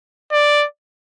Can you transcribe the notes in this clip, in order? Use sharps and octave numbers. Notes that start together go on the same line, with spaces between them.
D5